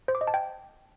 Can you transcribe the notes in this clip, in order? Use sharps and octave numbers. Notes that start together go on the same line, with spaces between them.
C5
D6
D#5
A5
G5